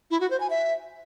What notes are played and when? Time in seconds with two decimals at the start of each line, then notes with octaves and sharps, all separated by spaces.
0.11 E4
0.21 F#4
0.30 C5
0.40 G#5
0.50 E5